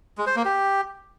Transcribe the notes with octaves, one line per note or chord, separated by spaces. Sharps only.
G#3
C5
A#3
G4